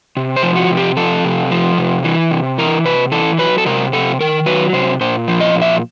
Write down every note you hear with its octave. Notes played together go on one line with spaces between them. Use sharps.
C3
C5
F3
F#4
C3
G4
F3 A4
C3
F3
C3
E3
C3
E3 A#4
C3 B4
E3 A4
F#3 B4
A4
C3 A#4
C3 A4
D#3 A#4
F#3 B4
C3 C5
A#2 C5
F3
D#5
A#2
E5